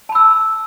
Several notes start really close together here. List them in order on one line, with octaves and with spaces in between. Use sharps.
A5 B5 E6